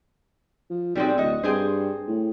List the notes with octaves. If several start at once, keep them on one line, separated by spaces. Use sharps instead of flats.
F3
B1 G3 G#3 C4
D1 F#4 D#5
G2 C4 G#4 C5
A2